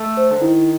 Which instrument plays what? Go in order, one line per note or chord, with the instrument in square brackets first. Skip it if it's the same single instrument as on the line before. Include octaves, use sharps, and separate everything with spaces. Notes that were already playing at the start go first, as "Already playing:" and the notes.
Already playing: [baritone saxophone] A3
[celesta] C5
[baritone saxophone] D3
[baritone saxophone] D#3 [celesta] E4